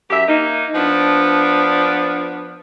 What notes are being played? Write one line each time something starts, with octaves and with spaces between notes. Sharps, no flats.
F#2 G4 E5
A#3 D#4
F3 B3 D4